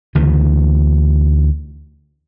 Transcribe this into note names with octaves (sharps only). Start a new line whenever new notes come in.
D2 C#3 E3